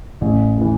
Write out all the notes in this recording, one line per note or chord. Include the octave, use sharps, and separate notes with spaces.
A1
A2 E3